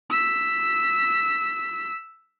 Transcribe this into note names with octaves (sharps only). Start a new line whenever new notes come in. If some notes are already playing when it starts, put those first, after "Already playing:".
E6 B6